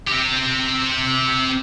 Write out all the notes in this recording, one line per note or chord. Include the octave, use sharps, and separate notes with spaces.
C4 G4